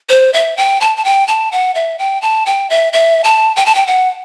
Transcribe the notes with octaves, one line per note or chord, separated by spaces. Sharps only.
C5
E5
G5
A5
A5
G5
A5
F#5
E5
G5
A5
G5
E5
E5
A5
G5
A5
G5
F#5